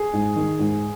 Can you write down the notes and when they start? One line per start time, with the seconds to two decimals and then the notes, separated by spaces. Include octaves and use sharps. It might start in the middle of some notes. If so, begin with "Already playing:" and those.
Already playing: G#4
0.13 G#2
0.36 D#3
0.59 G#2